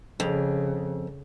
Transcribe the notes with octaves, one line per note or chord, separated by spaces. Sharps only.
F2 C#3